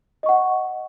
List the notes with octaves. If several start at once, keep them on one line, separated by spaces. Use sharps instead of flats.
D#5 F#5 C#6